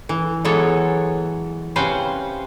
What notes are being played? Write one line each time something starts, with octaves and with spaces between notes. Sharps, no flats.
E3
E3 F#3 G#3 B3 A4 C#5
C3 C#4 B4 C5 F5